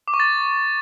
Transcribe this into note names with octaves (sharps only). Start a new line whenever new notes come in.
D6
C#6
A6